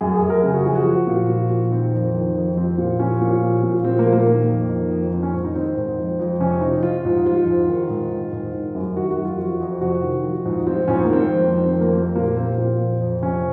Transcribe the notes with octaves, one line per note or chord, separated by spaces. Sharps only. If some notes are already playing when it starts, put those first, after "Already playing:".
F#2 G#4
G#4
F#2
A#4
C#3 G#4
F#4
F3 G#4
F#4
F3
A#2
F3
A#2
D#3 C4
F2
D#3
F2
F3 C4
A#2
F3 C#4
A#2
F3
A#2
F3 C4
A#3
A#2
A#3
D#3
F2
D#3
F2
D#3 C4
C#4
G#2
D#4
D#3 C4
G#2
F2
F2
C3 C#4
F3 D#4
F3 F4
G#2
F3 F4
G#2
D#3
G#2
D#3
G#2
D#3
F#2
D#3 F#4
F#4
F#2
F4
F2 F#4
F2
C3 F#4
D#3
F3
G#2
F3 C4
G#2 C#4
C4
A#3
D#3 C4
F2
D#3
C4
F2
A#3
F3 C4
A#2 A#3
F3 C4
A#2
F2
F2
C3 C#4